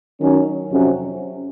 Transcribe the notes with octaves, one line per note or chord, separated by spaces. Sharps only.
D#3 F#3 C#4
F2 C3 F#3 C#4